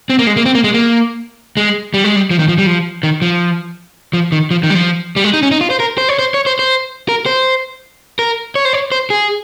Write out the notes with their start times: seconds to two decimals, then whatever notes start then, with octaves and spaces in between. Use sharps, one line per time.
0.10 C4
0.19 A#3
0.27 G#3
0.37 A#3
0.46 C4
0.55 A#3
0.64 G#3
0.74 A#3
1.57 G#3
1.94 G3
2.04 G#3
2.16 G3
2.31 F3
2.39 D#3
2.48 F3
2.58 G3
2.66 F3
3.03 D#3
3.22 F3
4.13 F3
4.32 D#3
4.51 F3
4.63 D#3
4.70 G3
4.75 F3
5.16 G3
5.24 G#3
5.33 D#4
5.43 C#4
5.51 D#4
5.61 F4
5.70 C5
5.80 A#4
5.98 C5
6.09 C#5
6.19 C5
6.34 C#5
6.46 C5
6.59 C5
7.09 A#4
7.26 C5
8.19 A#4
8.55 C#5
8.65 C5
8.73 C#5
8.92 C5
9.10 G#4